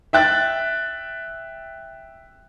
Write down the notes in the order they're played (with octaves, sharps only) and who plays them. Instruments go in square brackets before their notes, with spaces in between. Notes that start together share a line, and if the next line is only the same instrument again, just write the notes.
[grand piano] E5 G5 F#6 A6